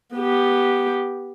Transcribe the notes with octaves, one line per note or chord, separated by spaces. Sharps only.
B3 G4